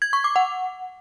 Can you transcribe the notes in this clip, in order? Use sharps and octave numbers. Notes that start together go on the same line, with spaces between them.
G#6
C#6
D6
F#5